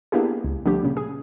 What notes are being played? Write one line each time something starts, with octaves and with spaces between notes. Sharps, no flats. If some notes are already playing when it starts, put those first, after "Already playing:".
A#3 B3 D4 E4 G4 G#4
C#2
D3 F3 G3 A3 G4
A#2 C#3
G#4